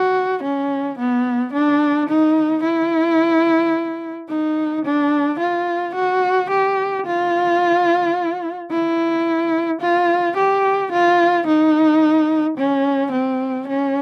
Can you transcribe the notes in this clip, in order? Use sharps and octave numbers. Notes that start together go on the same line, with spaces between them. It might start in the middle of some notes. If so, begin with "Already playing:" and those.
Already playing: F#4
C#4
B3
D4
D#4
E4
D#4
D4
F4
F#4
G4
F4
E4
F4
G4
F4
D#4
C#4
C4
C#4